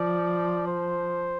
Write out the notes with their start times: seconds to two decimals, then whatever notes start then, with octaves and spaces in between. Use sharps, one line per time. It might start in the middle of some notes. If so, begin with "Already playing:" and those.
Already playing: F3 D5
0.68 C5